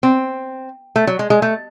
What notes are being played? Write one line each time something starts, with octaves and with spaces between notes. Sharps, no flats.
C4
A3
F#3
G#3
G#3
A3